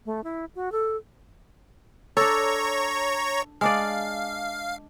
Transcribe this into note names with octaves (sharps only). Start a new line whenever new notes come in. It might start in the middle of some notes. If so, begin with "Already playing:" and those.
A3
E4
F#4
A4
D4 A4 C#5 A#5 C#6
G#3 D4 D5 F5